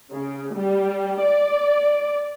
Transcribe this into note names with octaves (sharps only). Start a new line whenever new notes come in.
C#3
G3
D5